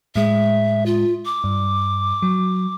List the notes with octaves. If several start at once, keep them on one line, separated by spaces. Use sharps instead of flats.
A2 G#3 E5
F4
D6
G2
F#3